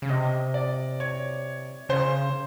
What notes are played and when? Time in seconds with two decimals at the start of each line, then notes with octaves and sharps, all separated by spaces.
0.02 C#3
0.09 C3 D#5
0.54 D5
1.00 C#5
1.89 C#3 C5